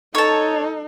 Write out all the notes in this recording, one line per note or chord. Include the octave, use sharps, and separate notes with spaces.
D#4 A4 C#5 A5